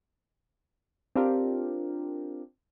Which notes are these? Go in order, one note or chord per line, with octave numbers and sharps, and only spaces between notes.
C4 D4 F4 G4 A#4